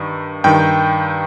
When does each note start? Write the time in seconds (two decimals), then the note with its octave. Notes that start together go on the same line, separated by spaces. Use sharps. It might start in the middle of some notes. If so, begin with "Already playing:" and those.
Already playing: G2 D#3
0.44 G2 D#3 G5